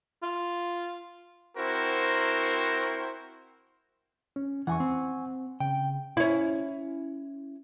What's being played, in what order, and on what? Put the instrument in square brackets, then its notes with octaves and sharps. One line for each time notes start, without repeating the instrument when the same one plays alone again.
[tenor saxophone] F4
[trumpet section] C4 E4 F#4 A#4 C5
[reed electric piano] C#4
[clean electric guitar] E2 E3 [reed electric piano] F#5 G#5 C#6
[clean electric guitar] C4
[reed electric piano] C#3 [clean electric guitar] G5
[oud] C#4 E4